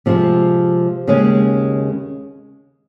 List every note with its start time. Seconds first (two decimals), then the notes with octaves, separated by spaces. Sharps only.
0.06 C3 F3 G#3
1.07 D#2 C#3 G#3 C#4